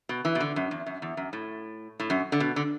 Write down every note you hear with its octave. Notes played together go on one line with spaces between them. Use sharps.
B2
E3
B2
D3
F#2
E2
F#2
E2
F#2
A2
A2
F#2
D3
B2
D3